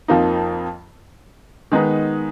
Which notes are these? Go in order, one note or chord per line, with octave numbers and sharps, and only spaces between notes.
F2 F3 A#3 D#4
D#3 G#3 B3 D#4